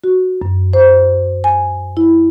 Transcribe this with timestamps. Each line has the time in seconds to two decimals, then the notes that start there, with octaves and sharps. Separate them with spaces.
0.04 F#4
0.42 F#2
0.73 C5
1.44 G#5
1.97 E4